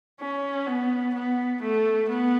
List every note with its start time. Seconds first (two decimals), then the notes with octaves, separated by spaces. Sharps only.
0.20 C#4
0.67 B3
1.15 B3
1.63 A3
2.09 B3